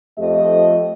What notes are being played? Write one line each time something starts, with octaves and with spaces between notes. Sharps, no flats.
F2 F3 A3 G4 D#5